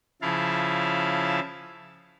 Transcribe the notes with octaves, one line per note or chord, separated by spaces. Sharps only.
C#3 F3 E4 F5 A5